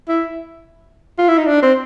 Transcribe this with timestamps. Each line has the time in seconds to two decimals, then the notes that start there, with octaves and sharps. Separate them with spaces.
0.09 E4
1.18 F4
1.28 E4
1.38 D#4
1.47 D4
1.62 C4